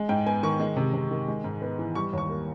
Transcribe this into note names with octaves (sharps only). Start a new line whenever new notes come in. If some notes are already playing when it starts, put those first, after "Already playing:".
Already playing: G#3
G#2 G5
B3 G#5
D#3 C#6
G#3
C3
C3
D#3
G#3
G#2
B3
E3
G3 C#6
D#2 C#6
A#3